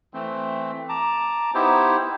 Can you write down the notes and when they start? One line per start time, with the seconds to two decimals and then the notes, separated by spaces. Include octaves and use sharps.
0.14 E3 A3 C4
0.89 A5 A#5 D6
1.54 B3 D#4 E4 G4 C5